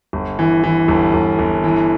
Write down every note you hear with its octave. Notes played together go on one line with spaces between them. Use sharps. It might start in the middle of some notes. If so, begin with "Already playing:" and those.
G1
E3
E3
G1
G1
G1
E3